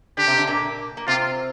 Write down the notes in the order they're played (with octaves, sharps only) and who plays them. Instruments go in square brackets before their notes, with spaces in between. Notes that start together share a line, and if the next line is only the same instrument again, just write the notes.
[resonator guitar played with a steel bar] D3 D4 [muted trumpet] G4
[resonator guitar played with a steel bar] C3 C4
D3 D4
A#2 A#3
A#3
[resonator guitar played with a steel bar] C3 C4 [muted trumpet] F4